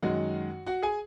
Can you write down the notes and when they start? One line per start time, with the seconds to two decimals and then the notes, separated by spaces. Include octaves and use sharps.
0.02 F#2 D#3 G#3 F#4 F#5
0.66 F#4 F#5
0.83 G#4 G#5